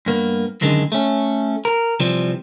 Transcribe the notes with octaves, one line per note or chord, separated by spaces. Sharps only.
G2 A#3 B3
F#2 D3 D#3 G#3
A3 C#4
A#4
C3 E3 F3 G3